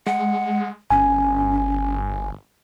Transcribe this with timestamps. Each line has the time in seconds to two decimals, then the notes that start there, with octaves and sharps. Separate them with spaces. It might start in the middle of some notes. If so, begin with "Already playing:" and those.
0.07 G#3 F#5
0.90 G1 C#4 G#5